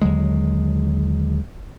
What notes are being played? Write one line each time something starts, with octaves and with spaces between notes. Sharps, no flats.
D#2 D3 F#3 G#3